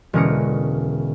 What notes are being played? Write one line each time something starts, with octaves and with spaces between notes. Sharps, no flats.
E1 D3 C#4 A#4 D#6 C#7